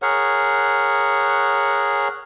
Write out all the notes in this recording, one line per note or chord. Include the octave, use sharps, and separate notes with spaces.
G#4 A#4 C#5 F#5